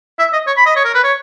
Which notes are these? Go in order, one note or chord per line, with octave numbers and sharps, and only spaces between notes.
E5
D#5
C#5
B5
D#5
C#5
A#4
B4
C#5